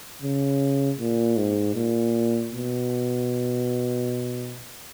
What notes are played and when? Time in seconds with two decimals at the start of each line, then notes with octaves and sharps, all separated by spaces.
0.22 C#3
0.99 A#2
1.37 G#2
1.75 A#2
2.51 B2